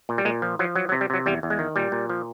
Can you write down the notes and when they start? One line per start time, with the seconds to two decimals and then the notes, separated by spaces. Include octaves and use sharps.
0.09 A#2
0.18 G3
0.25 A#2 G#3
0.42 F3
0.59 F3 F#3
0.76 F#3
0.89 F#3
0.92 C3
1.01 G3
1.10 C3 F#3
1.26 E2 G3
1.43 E2
1.50 G#3
1.59 D#3
1.76 A#2 G3
1.92 A#2
2.09 F3